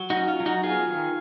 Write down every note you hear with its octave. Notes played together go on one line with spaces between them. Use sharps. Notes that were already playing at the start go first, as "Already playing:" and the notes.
Already playing: F#3
D#4 F#4
C#4
F4
F#3
D#4 F#4
B3 F4 G#4
D#3